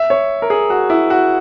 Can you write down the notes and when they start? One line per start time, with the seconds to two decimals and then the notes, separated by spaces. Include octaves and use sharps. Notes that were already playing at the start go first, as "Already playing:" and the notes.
Already playing: E5
0.10 C#5
0.42 A#4
0.50 G#4
0.70 F#4
0.90 E4
1.10 F#4